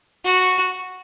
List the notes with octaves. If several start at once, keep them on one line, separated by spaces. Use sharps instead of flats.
F#4